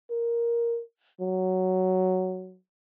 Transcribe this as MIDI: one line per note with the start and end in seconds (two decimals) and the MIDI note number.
0.10 0.81 70
1.20 2.57 54